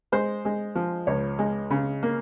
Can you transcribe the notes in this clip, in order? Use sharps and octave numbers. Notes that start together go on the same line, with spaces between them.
G#3 C5
G#3
F3
C#2 C#5
G#3
C#3
A#3